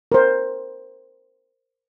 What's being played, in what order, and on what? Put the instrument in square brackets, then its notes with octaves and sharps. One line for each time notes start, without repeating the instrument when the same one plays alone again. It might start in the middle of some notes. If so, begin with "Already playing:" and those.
[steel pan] A#4 C5